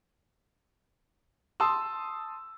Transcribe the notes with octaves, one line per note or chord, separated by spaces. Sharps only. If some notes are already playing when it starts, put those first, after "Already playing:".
A5 C6 D#6 E6